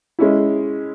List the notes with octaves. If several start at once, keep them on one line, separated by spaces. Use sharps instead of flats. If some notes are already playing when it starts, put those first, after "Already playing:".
G#3 C#4 E4